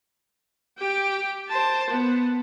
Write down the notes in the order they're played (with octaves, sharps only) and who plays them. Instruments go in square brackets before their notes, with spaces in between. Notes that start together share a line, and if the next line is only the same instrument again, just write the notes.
[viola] G4 G5
C5 A5
B3